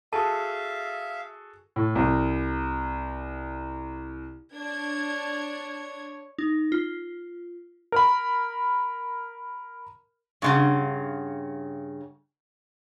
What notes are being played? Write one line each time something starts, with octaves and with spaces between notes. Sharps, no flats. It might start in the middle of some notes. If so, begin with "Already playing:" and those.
F#4 G#4 A4 E5 F5 A5
A2
C2
D4 C#5 G#6
D#4
F4
A#4 B5
G2 C#3 F#4 C6 C#6